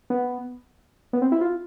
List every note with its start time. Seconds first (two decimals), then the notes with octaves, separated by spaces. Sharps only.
0.10 B3
1.13 B3
1.22 C4
1.32 E4
1.41 F4